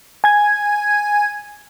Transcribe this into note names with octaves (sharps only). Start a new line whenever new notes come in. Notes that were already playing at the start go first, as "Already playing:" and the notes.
G#5 G#6